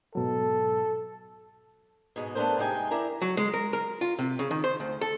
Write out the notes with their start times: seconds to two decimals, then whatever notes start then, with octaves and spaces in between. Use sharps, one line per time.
0.15 G#2 B2 F#3 A4
2.16 G#2 B2 G#3
2.35 A3 B3 C4 D4 A#4 C5
2.58 C3 G#3 D#4 G5 G#5
2.91 D4 E4 A#4 A#5
3.22 F#3
3.37 G#3
3.54 A#4
3.73 A#4
4.01 F4
4.19 C3
4.39 C#3
4.51 D#3
4.64 C5
4.80 D2
5.01 A4